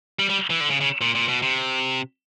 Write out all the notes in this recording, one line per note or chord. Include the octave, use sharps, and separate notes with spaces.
G3
G3
E3
D3
C#3
C#3
A#2
A#2
B2
C3